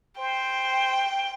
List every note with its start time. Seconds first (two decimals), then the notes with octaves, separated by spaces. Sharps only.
0.19 C5 G5